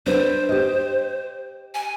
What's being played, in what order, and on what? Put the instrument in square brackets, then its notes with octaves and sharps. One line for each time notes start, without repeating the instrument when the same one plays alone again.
[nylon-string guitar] D4 B4 [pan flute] C5
[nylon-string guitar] G4 D#5
[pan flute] G#5